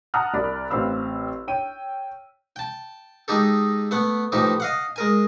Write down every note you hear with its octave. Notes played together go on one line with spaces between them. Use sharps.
F#5 A5 A#5 D#6 F6 F#6
C2 D5 B5
A1 C4 B4 F5 B5 E6
C#5 G5 D#7
G5 A5
G#3 D#4 G4 A4
A3 B3 F#5
A2 E3 F3 D#4 G4
D#5 F5 F#5
G#3 A#4 G#5